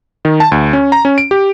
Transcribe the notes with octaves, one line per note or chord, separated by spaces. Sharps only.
D#3
A5
D2
C#4
A#5
C#4
D7
G4